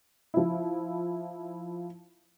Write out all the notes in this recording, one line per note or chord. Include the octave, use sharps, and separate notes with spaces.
F3 E4